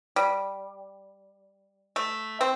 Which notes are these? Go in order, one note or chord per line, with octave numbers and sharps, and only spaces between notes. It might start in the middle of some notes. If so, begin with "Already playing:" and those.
G3
A3
C4